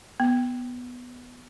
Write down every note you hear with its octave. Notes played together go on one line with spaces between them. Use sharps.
B3